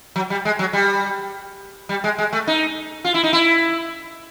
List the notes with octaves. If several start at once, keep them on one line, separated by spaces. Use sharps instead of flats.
F#3
G3
G#3
F#3
G3
G3
G#3
G#3
A3
D#4
F4
E4
D#4
E4